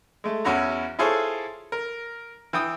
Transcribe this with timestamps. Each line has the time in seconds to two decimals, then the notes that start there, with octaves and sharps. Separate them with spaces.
0.24 G#3 A3
0.45 E2 C#4 E4 F#4 A#5
0.99 E4 F4 G#4 A4 C5 C#5
1.72 A#4
2.53 E3 G5 D#6